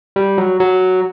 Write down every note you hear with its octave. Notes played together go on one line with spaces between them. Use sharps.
G3
F#3
F#3